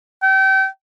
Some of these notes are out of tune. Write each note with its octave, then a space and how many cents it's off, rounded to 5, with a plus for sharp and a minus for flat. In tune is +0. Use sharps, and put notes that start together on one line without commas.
G5 -30